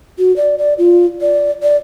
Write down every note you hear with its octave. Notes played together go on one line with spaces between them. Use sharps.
F#4
D5
D5
F4
D5
D5